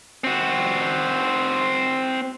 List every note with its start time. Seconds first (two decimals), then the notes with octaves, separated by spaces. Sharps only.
0.24 C4 F#4